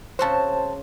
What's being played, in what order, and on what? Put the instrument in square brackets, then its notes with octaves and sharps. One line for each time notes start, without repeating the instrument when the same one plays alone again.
[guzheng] C#3 C4 F#4 [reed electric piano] C5 A5